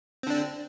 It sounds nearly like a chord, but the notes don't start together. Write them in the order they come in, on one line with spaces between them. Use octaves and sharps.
C4 D3 D4